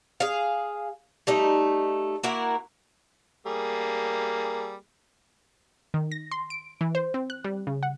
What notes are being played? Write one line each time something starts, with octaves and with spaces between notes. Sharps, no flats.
G#4 F5
G3 A3 D#4
A#3 E4 F#4 A#4
G3 A#3 G#4
D#3
A#6
C6
D7
E3
C5
C4
F#6
G3
C#3
F#5